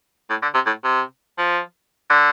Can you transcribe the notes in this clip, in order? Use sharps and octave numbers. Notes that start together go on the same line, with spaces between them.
A2
D3
C3
A2
C3
F3
D3